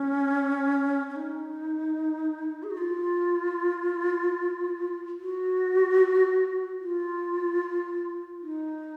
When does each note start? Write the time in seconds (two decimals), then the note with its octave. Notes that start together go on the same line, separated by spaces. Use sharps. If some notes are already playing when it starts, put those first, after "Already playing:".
Already playing: C#4
1.10 C#4
1.16 D#4
2.63 G#4
2.70 F#4
2.78 F4
5.20 F#4
6.81 F4
8.42 D#4